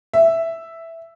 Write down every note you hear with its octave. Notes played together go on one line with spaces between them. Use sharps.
E5